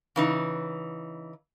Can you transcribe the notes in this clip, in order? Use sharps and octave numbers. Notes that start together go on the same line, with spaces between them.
C#3 E3 D#4